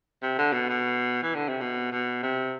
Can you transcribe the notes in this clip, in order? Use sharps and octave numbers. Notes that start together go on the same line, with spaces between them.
C3
D3
B2
B2
E3
D3
C3
B2
B2
C3